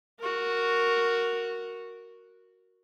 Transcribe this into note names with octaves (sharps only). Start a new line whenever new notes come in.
F#4 A#4